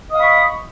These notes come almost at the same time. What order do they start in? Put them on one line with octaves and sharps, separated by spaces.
D#5 D#6 F5 B5 C#6